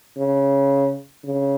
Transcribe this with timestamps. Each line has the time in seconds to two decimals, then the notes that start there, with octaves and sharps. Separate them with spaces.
0.18 C#3
1.25 C#3